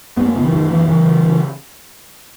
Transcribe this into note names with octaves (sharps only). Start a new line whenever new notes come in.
F#2 B3
A#3
C#3 B3
E3
F#2 D#3
F#2 E3
C#3 E3
C#3
C#3